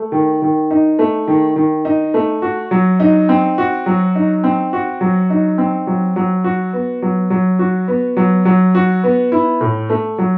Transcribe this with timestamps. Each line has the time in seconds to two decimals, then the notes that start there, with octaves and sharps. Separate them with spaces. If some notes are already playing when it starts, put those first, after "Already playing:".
Already playing: A3
0.12 D#3
0.42 D#3
0.71 D#4
0.99 A3
1.27 D#3
1.56 D#3
1.85 D#4
2.14 A3
2.42 F#4
2.71 F#3
3.00 D#4
3.29 C4
3.58 F#4
3.86 F#3
4.15 D#4
4.44 C4
4.73 F#4
5.01 F#3
5.30 D#4
5.58 C4
5.87 F#3
6.16 F#3
6.44 F#4
6.73 B3
7.02 F#3
7.30 F#3
7.59 F#4
7.88 B3
8.17 F#3
8.45 F#3
8.75 F#4
9.04 B3
9.32 E4
9.61 A2
9.90 A3
10.18 F#3